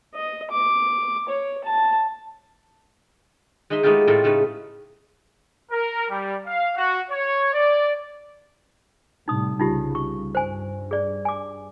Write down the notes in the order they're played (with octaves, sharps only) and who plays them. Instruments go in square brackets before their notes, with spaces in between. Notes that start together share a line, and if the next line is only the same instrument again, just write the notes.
[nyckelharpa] D#5
D6
C#5
A5
[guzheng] G#3 D#4 D#5 E5 C6
G#3 A3 B3 D#4 F4 G4
A2 C4 F4 A4 A#5
C#3 A3 D#4 B4
[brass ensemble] A#4
G3
F5
F#4
C#5
D5
[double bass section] A2 C3 G3 [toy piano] D#4 D#6
[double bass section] C2 C#3 [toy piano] D#4 F4 G4
[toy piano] C#6
[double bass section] G2 [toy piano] C5 G#5
[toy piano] G#4 D5
G#5 D6